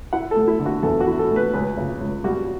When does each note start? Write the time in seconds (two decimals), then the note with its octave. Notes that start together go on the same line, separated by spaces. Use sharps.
0.13 E4 F#5
0.31 A4
0.36 A3
0.48 E4
0.60 D3
0.66 F#4
0.83 E2 A4
1.00 F#4
1.07 E4
1.19 A4
1.31 A3
1.36 B4
1.53 C#2 B4
1.77 C#3
2.01 C#2
2.24 G3 F#4